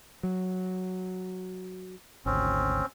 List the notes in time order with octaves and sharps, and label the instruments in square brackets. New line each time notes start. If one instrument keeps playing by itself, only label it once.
[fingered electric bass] F#3
[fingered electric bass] G#1 D2 [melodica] C4 C#4